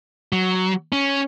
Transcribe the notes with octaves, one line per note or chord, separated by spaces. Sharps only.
F#3
C#4